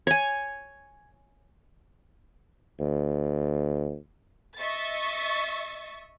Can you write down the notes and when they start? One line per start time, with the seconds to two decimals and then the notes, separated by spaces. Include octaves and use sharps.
0.07 C#5 G#5
2.80 D2
4.58 D#5 E5 C#6 A6